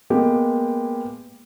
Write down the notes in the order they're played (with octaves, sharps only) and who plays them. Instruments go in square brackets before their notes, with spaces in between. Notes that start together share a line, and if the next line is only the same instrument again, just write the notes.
[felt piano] G#3 A#3 B3 G4 G#4